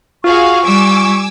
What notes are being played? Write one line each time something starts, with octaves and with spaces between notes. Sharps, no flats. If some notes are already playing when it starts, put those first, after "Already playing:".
F4 F#4 G#4 F5 C#6
G3 G#5 D6 E6